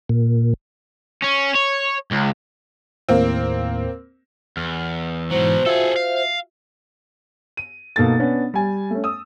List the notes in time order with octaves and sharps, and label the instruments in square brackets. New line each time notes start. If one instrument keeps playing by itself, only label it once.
[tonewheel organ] A#2
[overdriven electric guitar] C#4
C#5
C#2
[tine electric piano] D#2 A2 [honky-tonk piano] A#3 C4
[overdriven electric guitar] E2 [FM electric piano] F6
[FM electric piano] G#2 E3 [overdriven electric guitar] B2 F#3 [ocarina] C5
[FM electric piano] F4 F#4 E5 [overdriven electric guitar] G#4 A4
[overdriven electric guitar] F5
[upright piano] D#7
B2 A#3 D#4 A4 A6
B3 C#4 D4
G3 G#5
A3 C#4
D#6 E6